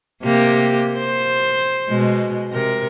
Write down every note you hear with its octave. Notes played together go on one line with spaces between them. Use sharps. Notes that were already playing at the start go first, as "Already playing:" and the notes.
C3 A#3 G4
C5
B2 G#3
C3 A#4